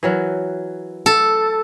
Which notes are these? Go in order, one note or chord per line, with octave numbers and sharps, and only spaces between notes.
E3 F#3 A#4
A4